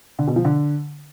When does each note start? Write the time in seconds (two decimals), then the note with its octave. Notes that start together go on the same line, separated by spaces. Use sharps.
0.19 D3
0.27 B2
0.36 F3
0.45 D3